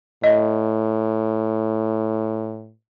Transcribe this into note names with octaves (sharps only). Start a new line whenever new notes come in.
A2 D#5